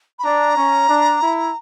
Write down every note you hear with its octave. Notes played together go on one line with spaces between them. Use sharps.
B5
D4 A#5
C#4
D4
E4